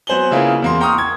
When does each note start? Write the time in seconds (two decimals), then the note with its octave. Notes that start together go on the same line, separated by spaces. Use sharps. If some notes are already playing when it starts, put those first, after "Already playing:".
0.07 F#3 B3 C5 G#5 F#7 G7
0.31 C#3 A#3 E4 F4 G#4
0.62 E2 A#3 C6
0.81 G5 A#5 C6 C#6 D#6 F6
0.98 G#6